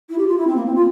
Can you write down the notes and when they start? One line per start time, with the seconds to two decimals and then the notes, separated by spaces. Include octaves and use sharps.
0.10 E4
0.18 G4
0.28 F4
0.38 E4
0.47 C4
0.56 A#3
0.66 C4
0.75 F4